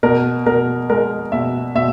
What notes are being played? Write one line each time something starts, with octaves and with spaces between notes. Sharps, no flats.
B2 A#4
B2 A#4
G#3 A#4
B2 E5
B2 E5